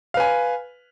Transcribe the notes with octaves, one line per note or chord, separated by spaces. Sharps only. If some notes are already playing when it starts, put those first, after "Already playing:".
B4 F5 G#5